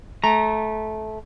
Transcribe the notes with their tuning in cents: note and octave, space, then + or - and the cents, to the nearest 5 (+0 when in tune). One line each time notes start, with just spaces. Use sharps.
A3 -20 A#5 +0